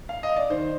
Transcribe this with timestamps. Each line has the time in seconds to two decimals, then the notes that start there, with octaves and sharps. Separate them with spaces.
0.09 F5
0.23 D#5
0.36 D5
0.50 D#3 C5